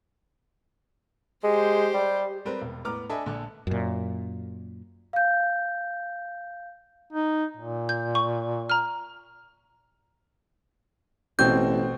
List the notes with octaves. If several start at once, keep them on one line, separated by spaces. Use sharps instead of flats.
G#3 G4 C5
G3
G3 C4 A#4 B4
E1
A2 B3 A#5 D6 F6
D4 A4 D#5 E5 G#5 B5
A#1 D3 A4 D5
F#2 A#2
F5 G6
D#4
A#2
G6
C#6
A#5 F6
A1 B2 C4 G6